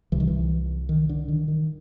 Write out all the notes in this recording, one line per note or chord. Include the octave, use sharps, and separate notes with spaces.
C2 C3 E3
D#3
E3
D#3
D3
D#3
D#3